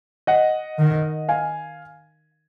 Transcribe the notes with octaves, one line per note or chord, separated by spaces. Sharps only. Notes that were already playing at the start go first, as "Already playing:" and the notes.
D#5 F#5
D#3
F5 G#5